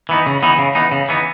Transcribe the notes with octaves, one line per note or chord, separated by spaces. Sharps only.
E3 B3 D#4
C#3
E3 B3 D#4
C#3
E3 B3 D#4
C#3
E3 B3 D#4